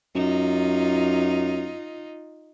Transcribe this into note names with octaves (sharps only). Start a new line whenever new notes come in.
F#2 D#4 F4